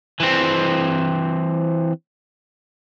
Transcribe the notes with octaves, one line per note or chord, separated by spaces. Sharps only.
E3 C4